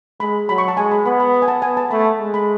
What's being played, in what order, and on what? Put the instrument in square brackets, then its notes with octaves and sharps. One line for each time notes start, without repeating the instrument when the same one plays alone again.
[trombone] G#3 [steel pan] B5
[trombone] F#3 [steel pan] B5
[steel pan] C#6
A5
[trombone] G#3 [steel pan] G#5
[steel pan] B5
[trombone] B3 [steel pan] B5
[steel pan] B5
B5
G#5
A5
[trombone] B3 [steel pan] G#5
[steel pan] A5
[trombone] A3 [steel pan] B5
[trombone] G#3
[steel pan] B5